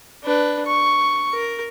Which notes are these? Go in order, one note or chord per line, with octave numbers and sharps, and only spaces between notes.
D4 B4
C#6
A#4